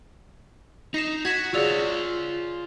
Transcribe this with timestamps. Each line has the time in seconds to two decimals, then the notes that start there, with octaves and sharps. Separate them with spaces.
0.94 D#4 A#6 C7 E7
1.25 F#4 G#6 B6 E7
1.54 F4 G#4 C#5 D5 E6